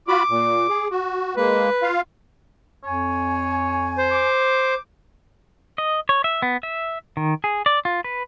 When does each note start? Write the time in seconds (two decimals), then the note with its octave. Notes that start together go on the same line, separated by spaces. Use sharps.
0.08 F4 F#4 B5 D6
0.29 A#2
0.69 G#4
0.91 F#4
1.37 G#3 A#3 B4
1.82 F4 F5
2.84 F2 C#5 G#5
3.98 C5
4.11 D6
5.78 D#5
6.09 C#5
6.24 E5
6.42 B3
6.63 E5
7.17 D#3
7.44 G#4
7.66 D5
7.85 F4
8.04 B4